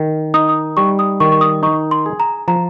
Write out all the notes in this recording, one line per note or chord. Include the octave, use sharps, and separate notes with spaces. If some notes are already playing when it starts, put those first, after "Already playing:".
Already playing: D#3
D#4 D#6
D#6
G3 C#6
D#6
D#3 C#6
C#6
D#6
D#4 C#6
C6
G#4
A#5
F3 A#5